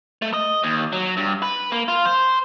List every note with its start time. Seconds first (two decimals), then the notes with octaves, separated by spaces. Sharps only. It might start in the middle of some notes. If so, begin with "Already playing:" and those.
0.22 A3
0.34 D#5
0.63 D#2
0.93 F#3
1.17 G2
1.42 B4
1.72 A#3
1.88 F4
2.06 C5